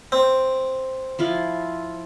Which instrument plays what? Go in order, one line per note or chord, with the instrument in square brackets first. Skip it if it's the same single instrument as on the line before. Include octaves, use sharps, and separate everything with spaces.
[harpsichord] C4
[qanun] F3 E4 F4